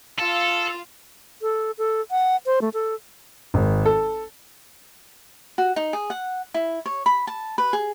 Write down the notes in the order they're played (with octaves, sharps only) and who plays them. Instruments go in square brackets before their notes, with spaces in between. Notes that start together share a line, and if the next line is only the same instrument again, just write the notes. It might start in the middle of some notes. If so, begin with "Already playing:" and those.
[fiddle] F4 F5 [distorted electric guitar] A4
[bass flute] A4
A4
F#5
C5
A3
A4
[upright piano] G#1
A4
[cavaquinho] F#4
D#4
G#4
F#5
E4
C#5
B5
A5
B4
G#4